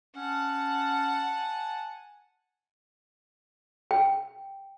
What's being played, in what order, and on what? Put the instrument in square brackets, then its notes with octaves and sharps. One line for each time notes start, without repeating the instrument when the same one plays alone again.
[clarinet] C#4 [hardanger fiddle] F#5 A5
[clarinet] G#5
[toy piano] G5